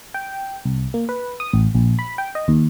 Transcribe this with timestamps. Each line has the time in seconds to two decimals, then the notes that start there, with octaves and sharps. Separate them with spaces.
0.14 G5
0.65 C2
0.94 A#3
1.09 B4
1.40 D#6
1.53 A1
1.75 A#1
1.99 B5
2.18 G5
2.35 D#5
2.48 D#2